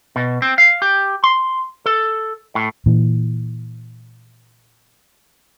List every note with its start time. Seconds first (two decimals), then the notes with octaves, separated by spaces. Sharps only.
0.16 B2
0.42 C4
0.58 F5
0.82 G4
1.24 C6
1.86 A4
2.55 A2
2.86 A#2 E3